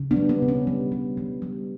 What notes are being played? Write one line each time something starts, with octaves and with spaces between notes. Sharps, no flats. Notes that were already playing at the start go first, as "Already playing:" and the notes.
Already playing: C#3
B3 D4
G3
B3
C#3
C#4
G3
G3
G3
G3